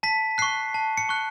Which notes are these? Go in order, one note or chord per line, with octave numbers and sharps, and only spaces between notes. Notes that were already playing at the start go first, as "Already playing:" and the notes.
A5 B6
C#6 F#6 C7
A5
C#7
C#6 F#6